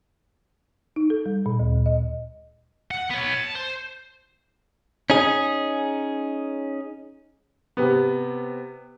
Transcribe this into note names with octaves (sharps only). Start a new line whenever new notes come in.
D#4
A4
G3
A#2
D2
D#5
F#5
B3 C#5
A5
C5
C#4 D#4 G#4
C3 B3